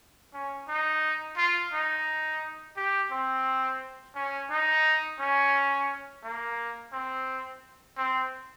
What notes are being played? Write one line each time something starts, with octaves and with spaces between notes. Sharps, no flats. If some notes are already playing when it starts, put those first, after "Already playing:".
C#4
D#4
F4
D#4
G4
C4
C#4
D#4
C#4
A#3
C4
C4